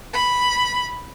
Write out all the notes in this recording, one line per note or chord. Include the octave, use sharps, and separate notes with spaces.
B5